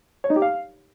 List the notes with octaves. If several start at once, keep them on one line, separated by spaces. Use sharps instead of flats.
C#5
D#4
G4
F5